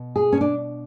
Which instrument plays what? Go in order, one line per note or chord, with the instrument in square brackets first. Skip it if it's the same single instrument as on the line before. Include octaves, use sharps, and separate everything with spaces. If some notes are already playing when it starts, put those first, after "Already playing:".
Already playing: [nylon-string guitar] B2
G#4
C#4
D4